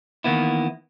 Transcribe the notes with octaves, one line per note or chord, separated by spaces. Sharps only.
D#3 E3 A#3 B3 E4